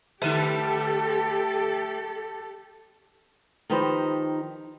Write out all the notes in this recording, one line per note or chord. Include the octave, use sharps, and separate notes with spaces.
D3 G3 A3 G4 A4 B4
D#3 F3 D#4 G4 B4 C5